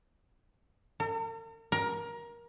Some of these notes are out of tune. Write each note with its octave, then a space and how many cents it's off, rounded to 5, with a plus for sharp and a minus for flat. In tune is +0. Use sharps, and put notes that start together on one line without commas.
A#4 -45
A#4 +20